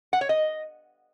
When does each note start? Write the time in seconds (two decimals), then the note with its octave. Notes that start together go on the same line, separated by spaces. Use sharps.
0.13 F#5
0.21 C#5
0.29 D#5